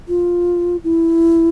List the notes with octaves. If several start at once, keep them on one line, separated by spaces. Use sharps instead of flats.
F4
E4